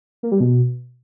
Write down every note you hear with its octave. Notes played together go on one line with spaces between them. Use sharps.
A#3
G3
B2